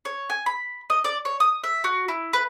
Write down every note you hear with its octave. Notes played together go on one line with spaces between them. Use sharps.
C#5
G#5
B5
D#5
D5
C#5
D#6
E5
F#4
E4
B4